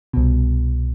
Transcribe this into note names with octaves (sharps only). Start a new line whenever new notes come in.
C2 B2